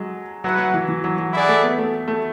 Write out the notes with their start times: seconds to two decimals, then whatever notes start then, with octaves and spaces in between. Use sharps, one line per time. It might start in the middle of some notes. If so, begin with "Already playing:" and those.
Already playing: F#3 G#3
0.44 F#3 E4 B4 F#5
0.58 F#3
0.74 E3
0.89 E3
1.04 F#3
1.19 F#3
1.33 E4 G#4 D5 F#5
1.49 A3
1.64 B3
1.78 A3
2.08 A3